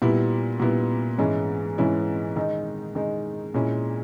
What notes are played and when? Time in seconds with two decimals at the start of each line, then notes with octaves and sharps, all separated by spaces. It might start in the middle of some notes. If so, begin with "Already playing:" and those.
0.02 A#2 G3 B3 E4
0.60 A#2 G3 B3 E4
1.18 G#2 E3 G#3 C#4 E4
1.78 G#2 E3 G#3 C#4 E4
2.36 D#3 G#3 D#4
2.95 D#3 G#3 D#4
3.54 A#2 G#3 C#4 E4